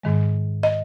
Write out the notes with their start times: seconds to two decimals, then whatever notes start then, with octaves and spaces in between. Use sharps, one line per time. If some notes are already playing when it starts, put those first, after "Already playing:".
0.03 G#2 D#3 G#3
0.63 D#5